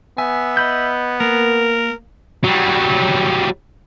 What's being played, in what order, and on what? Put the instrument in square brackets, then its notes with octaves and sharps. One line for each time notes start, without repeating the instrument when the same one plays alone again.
[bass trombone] B3 [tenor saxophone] E5 [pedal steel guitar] G#5
[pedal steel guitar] D#5 B5 G6
[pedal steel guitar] A#3 [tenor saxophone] A#4
[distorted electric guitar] F#3 G3